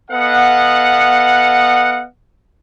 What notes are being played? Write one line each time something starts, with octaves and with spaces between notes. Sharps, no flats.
B3 A4 D#5 F5 F#5